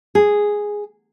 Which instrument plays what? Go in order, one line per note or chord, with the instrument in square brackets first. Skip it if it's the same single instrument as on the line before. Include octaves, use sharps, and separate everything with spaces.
[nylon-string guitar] G#4